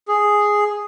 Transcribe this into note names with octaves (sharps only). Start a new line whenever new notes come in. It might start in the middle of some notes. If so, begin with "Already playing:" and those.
G#4